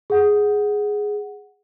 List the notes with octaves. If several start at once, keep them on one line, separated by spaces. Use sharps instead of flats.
G#4 F#5